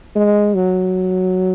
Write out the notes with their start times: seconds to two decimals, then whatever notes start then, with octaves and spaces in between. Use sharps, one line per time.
0.15 G#3
0.55 F#3